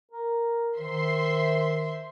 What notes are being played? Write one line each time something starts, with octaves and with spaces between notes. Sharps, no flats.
A#4
D#3 C5 E5 C6